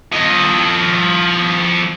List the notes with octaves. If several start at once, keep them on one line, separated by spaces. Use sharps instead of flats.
F3 D#5